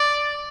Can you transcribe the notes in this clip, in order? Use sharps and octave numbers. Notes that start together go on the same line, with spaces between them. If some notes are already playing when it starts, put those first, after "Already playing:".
Already playing: D5